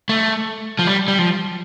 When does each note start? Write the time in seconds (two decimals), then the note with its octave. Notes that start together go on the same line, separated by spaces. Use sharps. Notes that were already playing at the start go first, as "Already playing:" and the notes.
0.09 A3
0.79 F3
0.87 G3
1.08 G3
1.19 F3